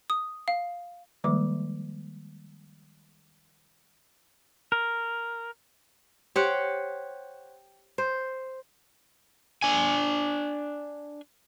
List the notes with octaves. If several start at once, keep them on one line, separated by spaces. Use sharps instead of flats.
D#6
F5
D#3 F3 G3 G#3 A#3 D6
A#4
G4 C5 C#5 F#5
C5
D4 G#5